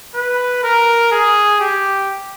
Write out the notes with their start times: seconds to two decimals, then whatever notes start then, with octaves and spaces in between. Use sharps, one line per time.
0.15 B4
0.64 A#4
1.12 G#4
1.60 G4